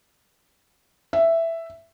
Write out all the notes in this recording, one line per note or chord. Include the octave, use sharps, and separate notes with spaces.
E5